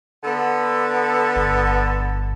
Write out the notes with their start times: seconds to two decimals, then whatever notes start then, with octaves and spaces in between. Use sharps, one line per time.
0.23 D3 B3 A4
1.36 G1